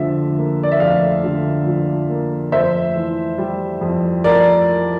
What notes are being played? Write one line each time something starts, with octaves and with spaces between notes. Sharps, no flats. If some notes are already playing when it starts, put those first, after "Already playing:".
Already playing: F2 D3 F3 E5
A#3
D5
E5
F2 D5 F5
D3
F3
A#3
F2 C5 E5
E3
G3
F2
F2 A#4 D5